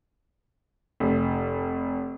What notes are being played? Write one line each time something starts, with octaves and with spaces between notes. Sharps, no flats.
F1